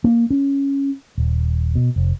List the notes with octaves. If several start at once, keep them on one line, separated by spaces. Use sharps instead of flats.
A#3
C#4
D#1
B2
F1